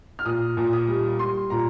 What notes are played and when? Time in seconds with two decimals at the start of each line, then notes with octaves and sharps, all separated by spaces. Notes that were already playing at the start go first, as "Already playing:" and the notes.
0.19 F6
0.26 A#2 D#6
0.57 A#2
0.73 D#6
0.88 G3
1.19 G3 C6
1.50 A#2 A#5